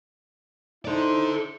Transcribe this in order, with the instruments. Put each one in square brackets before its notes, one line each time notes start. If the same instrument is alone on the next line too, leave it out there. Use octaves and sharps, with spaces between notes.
[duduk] D#4 [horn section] E4 C5 [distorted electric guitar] A4 D5